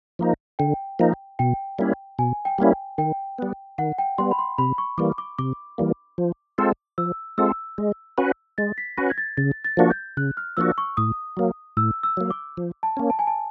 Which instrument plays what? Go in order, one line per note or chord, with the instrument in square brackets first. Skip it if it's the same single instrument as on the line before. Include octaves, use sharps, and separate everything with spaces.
[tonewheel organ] F3 A#3 D#4
[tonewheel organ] D3 [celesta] G5
[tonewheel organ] F3 A#3 D#4
[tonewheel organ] B2 [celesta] G5
[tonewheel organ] G3 A#3 C#4 E4
[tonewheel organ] B2 [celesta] G#5
[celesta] G5
[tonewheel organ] G3 A#3 C#4 E4
[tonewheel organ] D#3 [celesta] G5
[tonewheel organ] G3 B3
[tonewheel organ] D#3 [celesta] F#5
[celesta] G5
[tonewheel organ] G3 B3 [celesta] C6
[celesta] B5
C6
[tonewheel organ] C3 [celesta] B5
[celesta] C#6
[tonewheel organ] E3 G3 A#3 [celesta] D6
[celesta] D6
[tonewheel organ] C3 [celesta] D6
[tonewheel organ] E3 G3 A#3
F3
G#3 C4 F4 A4
[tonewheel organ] F3 [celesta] E6
[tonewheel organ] G#3 C4 F4 A4 [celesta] E6
[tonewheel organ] G#3
C#4 F#4 B4
[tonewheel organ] G#3 [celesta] A6
[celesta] B6
[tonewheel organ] C#4 F#4 B4 [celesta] A#6
[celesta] G#6
A6
[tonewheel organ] C#3 [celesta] A6
[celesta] A6
[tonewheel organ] F3 A#3 D4 F#4
[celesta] G6
[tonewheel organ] C#3 [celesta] F#6
[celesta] F6
[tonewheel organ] F3 A#3 D4 F#4 [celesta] E6
[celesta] C#6
[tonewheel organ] A2 [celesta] D#6
[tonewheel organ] F#3 A#3
[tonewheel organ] A2 [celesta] E6
[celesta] E6
[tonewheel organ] F#3 A#3
[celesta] D6
[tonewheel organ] F3
[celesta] A5
[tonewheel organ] A#3 C#4
[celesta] A5
G#5
A5